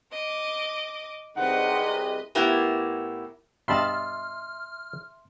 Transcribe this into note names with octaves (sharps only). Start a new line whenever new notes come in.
D#5 D6
C2 C3 G#3 D#4 B4 C5 D#5 F#5
A2 A#3 B3 E4 G4
G2 B2 D#5 E5 A5 B5 C6 F6